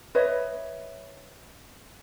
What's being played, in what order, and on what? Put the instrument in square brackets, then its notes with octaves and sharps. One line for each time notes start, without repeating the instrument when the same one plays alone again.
[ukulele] B4 C#5 D#5 E5